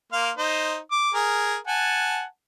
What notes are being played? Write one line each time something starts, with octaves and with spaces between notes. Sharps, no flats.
A#3 F5 C6
D#4 C5
D6
G#4 A#4
F#5 G#5 A5